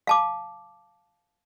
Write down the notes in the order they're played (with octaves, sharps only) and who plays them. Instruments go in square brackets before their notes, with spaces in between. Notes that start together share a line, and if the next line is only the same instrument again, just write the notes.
[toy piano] F5 A5 D6